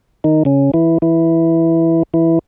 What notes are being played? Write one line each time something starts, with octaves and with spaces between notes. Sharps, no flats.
D#3 D#4
C#3 C#4
E3 E4
E3 E4
E3 E4